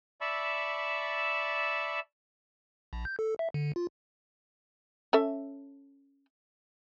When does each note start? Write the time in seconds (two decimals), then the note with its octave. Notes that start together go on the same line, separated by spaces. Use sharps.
0.21 D5 E5 A5 B5 C#6 E6
2.93 A#1
3.05 G6
3.19 A4
3.39 E5
3.54 D3
3.76 F4
5.13 C#4 A4 E5